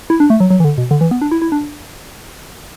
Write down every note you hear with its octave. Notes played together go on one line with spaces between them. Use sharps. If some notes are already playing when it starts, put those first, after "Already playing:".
E4
D4
A3
F#3
F#3
E3
D3
B2
D3
E3
B3
D4
E4
E4
D4